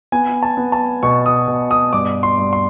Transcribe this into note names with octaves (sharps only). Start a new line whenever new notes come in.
B3 G#5
A5
B3
A5
B2 C#6
D#6
B2
D#6
G2 D6
C6
G2
C6